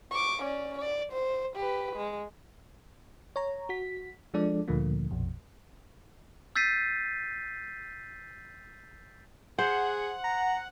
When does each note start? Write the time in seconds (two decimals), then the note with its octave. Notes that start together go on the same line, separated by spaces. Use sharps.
0.11 C#6 D6
0.42 C#4 D5
0.79 D5
1.12 C5
1.56 G4 B4
1.96 G#3
3.36 C#5 A#5
3.69 F#4 B6
4.34 F3 G#3 D4 A4 D5
4.68 D2 A#2 D3 F3 A3 A#3
5.11 A#1 F2 B2
6.56 E6 G6 A6 B6 C7 D#7
9.59 G#4 C5 F#5
10.24 A#5